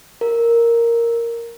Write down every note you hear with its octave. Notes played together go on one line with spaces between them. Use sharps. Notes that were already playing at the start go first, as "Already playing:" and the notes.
A#4